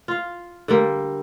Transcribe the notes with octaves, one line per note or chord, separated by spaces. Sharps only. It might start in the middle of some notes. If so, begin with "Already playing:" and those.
F4 F5
D3 G3 A#3